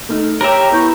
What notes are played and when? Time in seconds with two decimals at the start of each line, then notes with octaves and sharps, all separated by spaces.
0.09 A3 D#4 F6
0.41 G4 A#4 C#5 E5 A#5 G7
0.71 B3 E4 C#6 G6